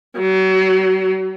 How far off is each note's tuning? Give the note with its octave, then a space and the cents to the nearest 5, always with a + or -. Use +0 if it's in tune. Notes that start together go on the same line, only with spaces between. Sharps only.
F#3 +35